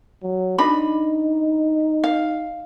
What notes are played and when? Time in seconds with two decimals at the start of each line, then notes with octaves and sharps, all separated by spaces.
0.23 F#3
0.58 D4 D#4 D#5 B5
2.04 F5